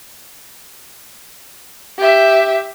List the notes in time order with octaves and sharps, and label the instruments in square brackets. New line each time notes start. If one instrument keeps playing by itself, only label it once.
[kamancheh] G4 E5